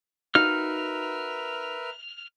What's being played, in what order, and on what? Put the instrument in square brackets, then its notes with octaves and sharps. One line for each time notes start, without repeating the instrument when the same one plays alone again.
[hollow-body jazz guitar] D#4 F#4 F5 [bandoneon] A#4 B4 E5 [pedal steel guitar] F6